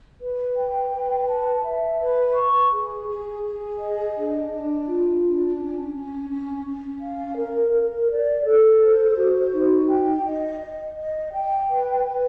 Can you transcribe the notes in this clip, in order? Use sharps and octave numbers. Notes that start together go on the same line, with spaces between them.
B4
G5
B4
A5
E5
B4
C#6
G#4
G#4
G#4
D#5
D4
D4
F4
D4
C#4
C#4
C#4
C#4
F5
A#4
A#4
D5
A4
C5
F#4
D#4
G5
D#5
D#5
D#5
G5
B4
B4